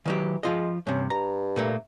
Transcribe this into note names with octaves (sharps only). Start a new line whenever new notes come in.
D#3 E3 F#3 G4
F3 G#3 F4 D#5
G2 C3 C#4
G2 A#5
A#2 A3 A#3